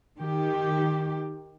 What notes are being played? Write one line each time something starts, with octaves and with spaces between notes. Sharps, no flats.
D#3 G4